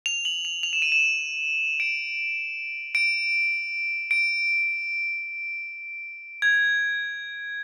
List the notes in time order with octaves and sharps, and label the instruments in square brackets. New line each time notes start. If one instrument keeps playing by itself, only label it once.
[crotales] F7
F#7
F7
F7
E7
D#7
E7
D7
D7
D7
G#6